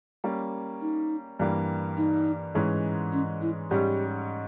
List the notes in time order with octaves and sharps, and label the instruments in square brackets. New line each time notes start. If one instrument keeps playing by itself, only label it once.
[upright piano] G3 A#3 C#4
[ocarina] D#4
[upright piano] G2 E3 G3 A#3
[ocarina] D#4
[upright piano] G#2 E3 G#3 C#4
[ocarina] C#4
E4
[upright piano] G#2 G3 C#4 [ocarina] G4